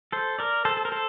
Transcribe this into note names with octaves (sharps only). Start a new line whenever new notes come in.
A4 C5
A#4 D5
A4 C5
A4
A#4
A4 C5